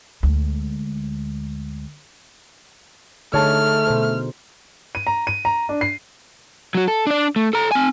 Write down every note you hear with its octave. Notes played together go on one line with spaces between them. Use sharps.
D2 G#3
D3 A3 D#4 G#4 C#5 A5 F6
B2 C5
D#7
A#5
D#7
A#5
D4
C7
F#3 F#4
A4
D4 D5
A3
A4 A#5
C4 G#5